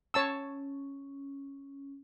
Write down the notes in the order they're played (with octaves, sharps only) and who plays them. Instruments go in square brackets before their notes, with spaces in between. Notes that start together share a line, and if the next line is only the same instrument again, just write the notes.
[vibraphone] C#4 [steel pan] C#5 A5 E6